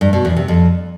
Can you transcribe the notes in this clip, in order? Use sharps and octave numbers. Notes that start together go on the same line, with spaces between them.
G2
B2
E2
C3
F2